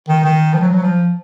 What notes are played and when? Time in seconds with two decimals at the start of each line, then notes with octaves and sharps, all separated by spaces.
0.08 D#3
0.23 D#3
0.54 F3
0.61 F#3
0.68 F3
0.75 F#3
0.83 F3